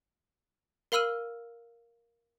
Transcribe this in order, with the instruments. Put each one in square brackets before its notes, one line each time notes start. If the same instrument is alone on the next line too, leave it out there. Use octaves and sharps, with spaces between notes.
[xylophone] A#4 F5 B5 E6 F6 D#7